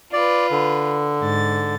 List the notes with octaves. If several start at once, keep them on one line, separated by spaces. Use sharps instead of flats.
F4 B4 D5
D3
G#2 A6